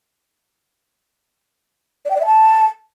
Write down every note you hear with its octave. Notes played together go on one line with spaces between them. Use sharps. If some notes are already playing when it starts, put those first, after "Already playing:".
D5
G5
D5
E5
A5